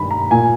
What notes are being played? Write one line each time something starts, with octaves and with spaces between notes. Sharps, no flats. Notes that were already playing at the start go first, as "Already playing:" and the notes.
Already playing: G2 D#3 B5
A#5
A#2 G#5